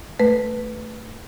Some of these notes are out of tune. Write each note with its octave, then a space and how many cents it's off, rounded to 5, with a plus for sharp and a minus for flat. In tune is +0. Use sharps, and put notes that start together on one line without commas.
A3 +0 B4 +0